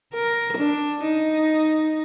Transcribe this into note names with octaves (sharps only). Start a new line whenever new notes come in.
A#4
D4
D#4